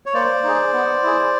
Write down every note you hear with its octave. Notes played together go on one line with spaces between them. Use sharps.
C#5
A#3 C5 D5
D#4 G#4
B3
E4 G#4